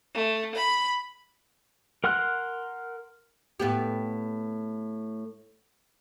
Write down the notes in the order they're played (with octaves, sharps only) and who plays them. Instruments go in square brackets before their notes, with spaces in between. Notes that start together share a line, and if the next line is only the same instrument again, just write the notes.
[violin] A3
B5
[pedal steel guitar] A#4 F#5 C6 F6 F#6
[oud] A2 B3 G4